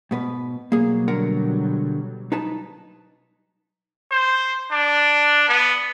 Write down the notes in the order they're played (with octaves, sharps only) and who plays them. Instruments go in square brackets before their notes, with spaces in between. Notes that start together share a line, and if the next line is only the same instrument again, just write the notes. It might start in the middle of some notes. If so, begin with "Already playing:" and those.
[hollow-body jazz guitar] G#2 B2 B4
[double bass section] B2 F#3 G3 [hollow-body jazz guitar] A#3 G#4
[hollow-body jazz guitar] D3 A#4 F#5
D#4 B4 A5
[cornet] C5
D4
B3